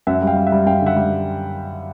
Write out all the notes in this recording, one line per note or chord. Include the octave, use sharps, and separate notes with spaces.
F#2 E5 F#5
G3
F5 G5
G3
E5 F#5
G3
F#2 F5 G5
D3
E5 F#5
G3